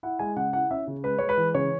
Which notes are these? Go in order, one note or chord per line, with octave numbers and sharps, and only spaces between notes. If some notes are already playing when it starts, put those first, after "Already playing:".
E4 F#5
G#3 G#5
C#3 F#5
E4 F#5
C#4 E5
C#3
G#3 B4
G#3 C#5
B4
E3
C#3 C#5